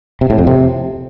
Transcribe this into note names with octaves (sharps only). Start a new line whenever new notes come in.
C3
A2
F2
C3